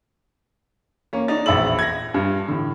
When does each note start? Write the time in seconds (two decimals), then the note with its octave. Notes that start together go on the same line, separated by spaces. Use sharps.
1.13 A#3 C#4
1.28 D4 D#4 A6
1.46 E1 A#1 E5 B5 E6 F#7
1.79 G#6 A#6
2.14 G2
2.48 A2 D3